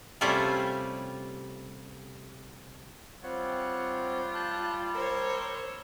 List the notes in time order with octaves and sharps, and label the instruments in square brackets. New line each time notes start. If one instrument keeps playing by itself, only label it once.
[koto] C3 G3 A3 C#4 E4 F4
[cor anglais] G3 [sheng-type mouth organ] C4 C#5 F#5 [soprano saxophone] F4
[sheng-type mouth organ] A5 F#6 G6
[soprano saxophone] A#4 [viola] C5 C#5 [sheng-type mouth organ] E6